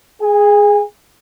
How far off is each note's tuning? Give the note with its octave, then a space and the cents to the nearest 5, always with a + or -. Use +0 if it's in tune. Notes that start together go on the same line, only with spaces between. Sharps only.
G#4 +0 G#5 -35